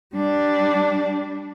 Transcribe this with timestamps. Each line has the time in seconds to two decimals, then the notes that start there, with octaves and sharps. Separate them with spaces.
0.15 G3 D4